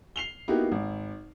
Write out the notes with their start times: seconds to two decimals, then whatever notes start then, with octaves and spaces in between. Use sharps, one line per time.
0.16 C7 F7 G7
0.48 A#3 B3 D#4 E4 F#4 G4
0.72 G#1